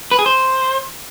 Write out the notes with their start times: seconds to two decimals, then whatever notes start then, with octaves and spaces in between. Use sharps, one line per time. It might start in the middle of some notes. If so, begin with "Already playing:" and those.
0.11 B4
0.19 G#4
0.26 C5